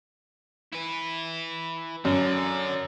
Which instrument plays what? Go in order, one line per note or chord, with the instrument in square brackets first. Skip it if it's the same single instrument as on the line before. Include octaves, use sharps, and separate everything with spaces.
[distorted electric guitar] E4 B4
[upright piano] F#2 [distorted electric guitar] D3